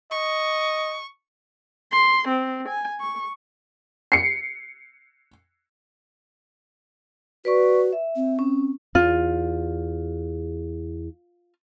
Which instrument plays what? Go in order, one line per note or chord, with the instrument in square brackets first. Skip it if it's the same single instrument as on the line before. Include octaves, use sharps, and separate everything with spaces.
[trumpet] D#5 [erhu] C#6
[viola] C6
C4
G#5
C#6
[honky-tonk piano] C7 C#7
[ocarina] F#4 [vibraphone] B4 D5 C#6
[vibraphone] E5
[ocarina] C4
[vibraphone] C#4
[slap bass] E2 [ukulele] F4